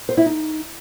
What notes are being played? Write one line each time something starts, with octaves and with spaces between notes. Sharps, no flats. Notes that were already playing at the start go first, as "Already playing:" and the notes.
C5
E4
D#4